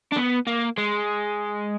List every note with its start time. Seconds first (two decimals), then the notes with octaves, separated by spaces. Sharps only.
0.12 D4
0.17 B3
0.47 A#3
0.78 G#3